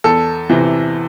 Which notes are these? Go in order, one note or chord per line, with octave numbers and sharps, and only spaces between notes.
E2 A4
C3 E3